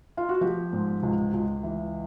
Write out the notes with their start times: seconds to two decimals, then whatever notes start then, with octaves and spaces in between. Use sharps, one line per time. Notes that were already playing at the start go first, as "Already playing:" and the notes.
0.17 F4
0.29 F#4
0.41 F3 G4
0.73 G#2
1.03 C#2
1.33 C#2
1.63 E3